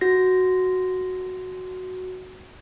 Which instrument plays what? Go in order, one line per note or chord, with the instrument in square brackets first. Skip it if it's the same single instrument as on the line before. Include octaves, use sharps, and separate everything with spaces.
[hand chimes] F#4 A#6